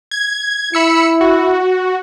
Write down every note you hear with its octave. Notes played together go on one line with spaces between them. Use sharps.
G#6
E4 B5 E6 C#7
F#4